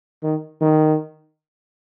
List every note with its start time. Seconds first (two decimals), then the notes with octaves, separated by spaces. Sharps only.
0.23 D#3
0.61 D#3